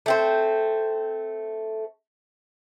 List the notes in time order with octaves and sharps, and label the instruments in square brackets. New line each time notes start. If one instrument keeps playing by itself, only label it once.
[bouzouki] A3 C4 C5